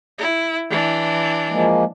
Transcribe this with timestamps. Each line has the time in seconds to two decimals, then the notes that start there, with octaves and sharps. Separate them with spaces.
0.18 E4
0.70 E3 D4
1.50 F3 G#3 A#3